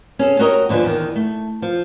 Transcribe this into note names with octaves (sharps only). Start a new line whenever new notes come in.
C#4 G#4 A4
F#4 G4 A#4 C#5 D#5
D#2 D3 F3 B4 G#5
E2 D#3
A3
F3